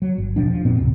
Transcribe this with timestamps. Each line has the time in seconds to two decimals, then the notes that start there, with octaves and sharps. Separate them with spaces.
0.02 F#3
0.18 G1
0.36 E1 B2 F3 D4
0.51 F3
0.64 F#2 A#2 B3 C4
0.79 D1 G#1 C3